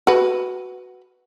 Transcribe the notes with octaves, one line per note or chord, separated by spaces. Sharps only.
F#4 B4